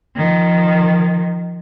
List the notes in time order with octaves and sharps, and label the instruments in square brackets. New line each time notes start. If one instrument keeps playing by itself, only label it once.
[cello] D#3 F3